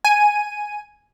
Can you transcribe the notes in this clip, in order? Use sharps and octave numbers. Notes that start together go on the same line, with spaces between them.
G#5 D#7